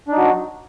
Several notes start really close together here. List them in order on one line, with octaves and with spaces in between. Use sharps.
D4 D#4 F#3